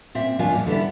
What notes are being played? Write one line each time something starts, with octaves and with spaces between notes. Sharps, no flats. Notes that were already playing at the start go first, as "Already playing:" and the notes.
A#2 C4 E5
D#2 F3 D4 F4 G#5
E2 A#2
D3 G3 B3 E4